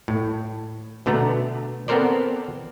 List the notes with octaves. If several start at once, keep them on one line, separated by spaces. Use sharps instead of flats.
A2
B2 D3 A3 B3 A#5
B3 C4 A4 A#4 C5 D5